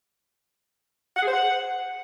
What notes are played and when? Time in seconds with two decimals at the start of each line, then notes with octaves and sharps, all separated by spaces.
1.16 F#5
1.22 G#4
1.28 C5
1.34 F#5